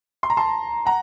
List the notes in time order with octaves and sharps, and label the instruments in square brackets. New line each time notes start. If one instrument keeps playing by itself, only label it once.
[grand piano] C6
A#5
A5 C6
F#5 A#5